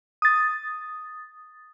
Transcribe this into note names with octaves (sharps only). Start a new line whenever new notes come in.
D#6 A6